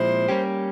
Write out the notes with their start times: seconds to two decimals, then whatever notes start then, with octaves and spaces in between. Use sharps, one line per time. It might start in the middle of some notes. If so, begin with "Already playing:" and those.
Already playing: A#2 F3 G#3 C4 E4 C5
0.29 G3 A#3 C#4 G4